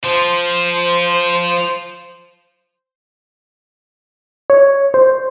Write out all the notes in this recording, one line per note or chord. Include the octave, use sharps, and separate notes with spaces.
F3 C5
C#5
C5